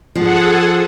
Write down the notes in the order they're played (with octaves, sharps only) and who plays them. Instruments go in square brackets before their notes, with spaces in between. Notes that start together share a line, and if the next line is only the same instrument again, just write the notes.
[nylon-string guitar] F3 [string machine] G#4 A4 F#5